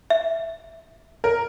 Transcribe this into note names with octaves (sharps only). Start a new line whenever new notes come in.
E5
A#4